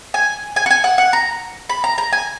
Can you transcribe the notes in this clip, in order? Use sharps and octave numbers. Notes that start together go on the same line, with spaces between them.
G#5
G#5
F#5
G#5
F#5
F#5
A#5
B5
A#5
A#5
G#5